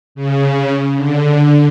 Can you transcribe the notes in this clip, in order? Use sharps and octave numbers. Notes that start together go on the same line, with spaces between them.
C#3
D3